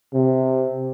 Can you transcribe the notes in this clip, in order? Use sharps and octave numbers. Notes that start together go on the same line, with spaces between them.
C3